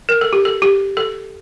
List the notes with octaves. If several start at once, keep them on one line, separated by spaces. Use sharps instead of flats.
A#4
A4
G4
A4
G4
A4